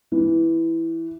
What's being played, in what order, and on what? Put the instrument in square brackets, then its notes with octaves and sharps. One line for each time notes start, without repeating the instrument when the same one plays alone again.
[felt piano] E3